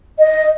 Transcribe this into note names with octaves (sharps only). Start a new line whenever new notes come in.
D#5